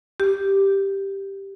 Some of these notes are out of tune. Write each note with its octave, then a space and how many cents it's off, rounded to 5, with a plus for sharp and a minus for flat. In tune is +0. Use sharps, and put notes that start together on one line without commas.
G4 +0